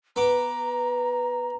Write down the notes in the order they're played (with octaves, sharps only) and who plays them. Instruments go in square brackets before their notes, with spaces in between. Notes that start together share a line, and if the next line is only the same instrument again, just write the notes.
[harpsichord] B3 D6 [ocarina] A#5